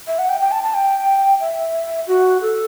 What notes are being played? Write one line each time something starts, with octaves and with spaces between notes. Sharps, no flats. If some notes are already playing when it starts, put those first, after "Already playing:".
E5
F#5
G5
G5
A5
A5
G5
E5
F#4
A4